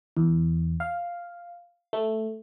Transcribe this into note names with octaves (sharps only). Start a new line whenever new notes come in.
E2
F5
A3